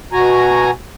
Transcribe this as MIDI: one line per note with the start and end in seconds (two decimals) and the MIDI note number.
0.13 0.71 47
0.13 0.71 66
0.13 0.71 80
0.13 0.71 82